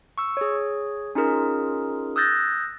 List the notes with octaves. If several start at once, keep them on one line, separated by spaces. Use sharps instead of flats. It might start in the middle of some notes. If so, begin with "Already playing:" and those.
C#6 E6
G#4 C#5
C#4 D#4 F4 G#4 A#4
D#6 E6 F#6 G6 A6 A#6